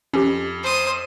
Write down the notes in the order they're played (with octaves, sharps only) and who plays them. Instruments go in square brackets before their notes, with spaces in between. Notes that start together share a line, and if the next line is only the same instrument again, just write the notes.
[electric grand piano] F2 [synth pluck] C#4 G4
[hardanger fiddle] C5 D#6